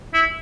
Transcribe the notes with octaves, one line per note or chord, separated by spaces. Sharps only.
E4